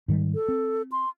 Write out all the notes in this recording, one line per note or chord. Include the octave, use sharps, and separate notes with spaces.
G#2 D#3 G3
A4
C4
C6